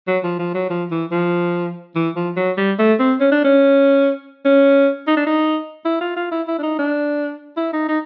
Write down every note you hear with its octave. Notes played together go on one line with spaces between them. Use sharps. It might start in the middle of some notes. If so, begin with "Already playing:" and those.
F#3
F3
F3
F#3
F3
E3
F3
E3
F3
F#3
G3
A3
C4
C#4
D4
C#4
C#4
D#4
D4
D#4
E4
F4
F4
E4
E4
D4
D#4
D4
E4
D#4
D#4